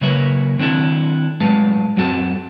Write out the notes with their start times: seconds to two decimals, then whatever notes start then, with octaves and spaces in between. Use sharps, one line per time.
0.01 C#3 F#3 A#3 B4 C#5 E5
0.58 D#3 C4 D4 E4 A4
1.40 A2 F#3 G#3 B4 F5 A5
1.96 F#2 F#3 C4 F#4 A4 A5